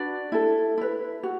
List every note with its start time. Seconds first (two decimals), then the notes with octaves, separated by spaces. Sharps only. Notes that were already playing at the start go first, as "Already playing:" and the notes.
Already playing: D4 F#4 B4 D5
0.32 E4 A4
0.78 E4 B4
1.23 F#4